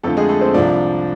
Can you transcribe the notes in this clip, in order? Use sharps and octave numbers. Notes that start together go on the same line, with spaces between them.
F2 D3 F3 A3 A4
G#3 G#4
A3 A4
C4 C5
C2 C3 F3 D4 D5